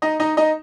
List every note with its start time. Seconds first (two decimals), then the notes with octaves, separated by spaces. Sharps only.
0.02 D#4 D#5
0.20 D#4 D#5
0.37 D#4 D#5